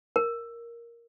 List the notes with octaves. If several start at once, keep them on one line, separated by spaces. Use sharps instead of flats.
A#4